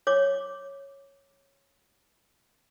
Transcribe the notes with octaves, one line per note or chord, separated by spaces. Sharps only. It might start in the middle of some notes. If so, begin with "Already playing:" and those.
C#5 D6